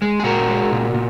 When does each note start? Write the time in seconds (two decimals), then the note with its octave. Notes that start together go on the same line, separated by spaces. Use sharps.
0.02 G#3
0.20 G#4
0.24 A#2 F#4 A#4
0.49 G#3
0.72 A#2
0.94 A#2